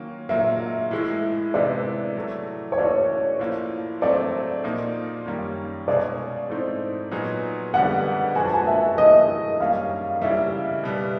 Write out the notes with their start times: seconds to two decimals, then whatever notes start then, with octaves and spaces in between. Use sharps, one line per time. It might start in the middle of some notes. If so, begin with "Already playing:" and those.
Already playing: D#3 F#3 A#3 C#4 F4
0.29 A#2 F#3 A#3 E5
0.91 A2 E3 G#3
1.54 C3 E3 G#3 B3 D5
2.15 A2 F#3 A3
2.72 C#5
2.78 E3 A3 C#4 F#4 A4 D5
3.39 A2 F3 A#3
4.02 F#3 A3 C4 D5
4.64 A#2 F3 A#3 D#4
5.26 F#2 D#3 G3 A#3 C#4
5.88 B2 G#3 C#4 F4 G#4 D5
6.50 G#2 E3 A3 C4 D#4
7.11 A#2 F#3 B3 D#4 G#4
7.74 F2 D3 G3 B3 F#5
8.35 F3 G#3 B3 D4 F#4 G#5
8.46 A5
8.54 G#5
8.66 E5
8.98 A2 F#3 A3 D#5
9.60 F#2 D#3 G3 A#3 C#4 F5
10.22 C#3 E3 G3 E5
10.84 B2 G3 B3